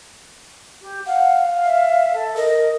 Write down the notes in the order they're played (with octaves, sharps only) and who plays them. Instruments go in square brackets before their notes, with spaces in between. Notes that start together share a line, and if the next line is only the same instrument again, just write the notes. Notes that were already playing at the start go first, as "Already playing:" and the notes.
[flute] G4
[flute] F5 [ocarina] F#5
[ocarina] E5
[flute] A4
[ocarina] A#4 [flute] D#5